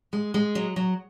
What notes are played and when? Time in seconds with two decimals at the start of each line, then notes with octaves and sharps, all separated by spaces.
0.13 G#3
0.34 G#3
0.55 F#3
0.76 F#3